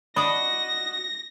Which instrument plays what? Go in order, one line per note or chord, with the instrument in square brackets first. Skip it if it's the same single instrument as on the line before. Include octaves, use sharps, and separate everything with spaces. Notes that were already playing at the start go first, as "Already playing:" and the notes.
[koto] D4 D5 [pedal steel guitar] F#4 D#5 [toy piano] B5 D#6 [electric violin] A#6